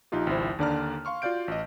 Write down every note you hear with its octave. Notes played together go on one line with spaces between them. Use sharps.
A#1 D#4 F4 G4
G#1 C#2 F3 E4 C5
D#2 D3 D4 D5 A#5 F6
F5 C6 C#6 F6
F4 F#4 D5 F5 G6 D7
A1 D#5